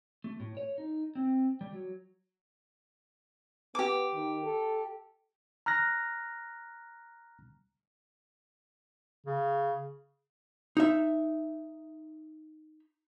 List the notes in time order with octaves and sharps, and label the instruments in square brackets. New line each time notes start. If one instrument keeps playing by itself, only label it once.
[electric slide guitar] A3
A2
C#5
D#4
C4
G3
F#3
[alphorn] B3 [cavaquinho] G4 D6
[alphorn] D#3
A4
[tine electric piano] A#5 F6 F#6 A#6
[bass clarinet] C#3
[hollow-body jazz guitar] D#4 E5